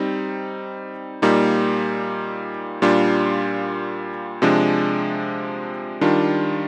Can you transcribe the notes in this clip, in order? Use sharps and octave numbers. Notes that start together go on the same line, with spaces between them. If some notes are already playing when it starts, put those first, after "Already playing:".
Already playing: G3 C4 D#4
A#2 G3 A#3 D#4
A#2 G3 D4 F4
C3 F3 G#3 D4
D#3 G3 D4 F4